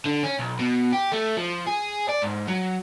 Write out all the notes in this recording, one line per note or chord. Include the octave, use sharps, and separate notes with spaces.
D3
C#4
B1
B2
G4
A3
F3
G#4
D5
G#2
F#3